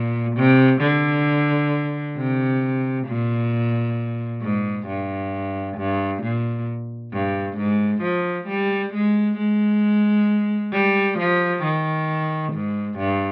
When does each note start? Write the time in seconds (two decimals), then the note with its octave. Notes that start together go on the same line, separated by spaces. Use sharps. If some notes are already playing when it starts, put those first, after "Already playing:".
Already playing: A#2
0.37 C3
0.81 D3
2.17 C3
3.07 A#2
4.42 G#2
4.88 G2
5.77 G2
6.23 A#2
7.13 G2
7.57 G#2
8.03 F3
8.49 G3
8.94 G#3
9.38 G#3
10.73 G3
11.19 F3
11.63 D#3
12.53 G#2
12.99 G2